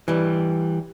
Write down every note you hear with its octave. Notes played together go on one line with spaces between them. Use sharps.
E3 G3